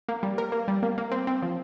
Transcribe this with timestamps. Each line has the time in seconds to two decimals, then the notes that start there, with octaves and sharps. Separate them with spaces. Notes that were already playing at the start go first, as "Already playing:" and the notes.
0.09 A#3
0.23 G3
0.38 A#4
0.52 A#3
0.68 G3
0.83 A#3
0.98 A#3
1.12 C4
1.27 C4
1.42 F3